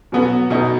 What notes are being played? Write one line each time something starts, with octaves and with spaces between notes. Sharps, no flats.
B2 F#3 B3 F#4
B2 B3 D#4